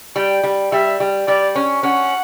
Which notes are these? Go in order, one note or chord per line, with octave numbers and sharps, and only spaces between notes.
G3 G5
G3
G3 E5
G3
G3 D5
C#4
C#4 F#5